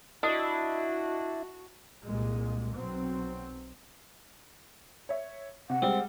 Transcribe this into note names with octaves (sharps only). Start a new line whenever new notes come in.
D4 E4 F#4 D#5 D#6
C2 A#2 G#3
B1 F#3 C4
C#5 E5
C3 F#5
G3 G#3 C4